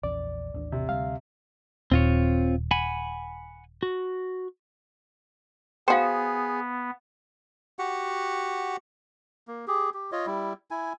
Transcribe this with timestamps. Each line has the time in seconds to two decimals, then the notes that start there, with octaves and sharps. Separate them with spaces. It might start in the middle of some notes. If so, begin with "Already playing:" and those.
0.03 A#1 E2 C#4 D5
0.54 A1 D#2 D4
0.72 C3
0.89 D2 G3 F5
1.92 D#1 C4 F4 C#5
2.71 F#5 G#5 B5
3.83 F#4
5.88 B3 F#4 G#4 C5 F5 G5
7.79 F#4 G4 F#5
9.48 A#3
9.67 G4 G#4
9.94 G4
10.12 F4 C#5 D#5
10.26 G3 E4
10.71 E4 G#5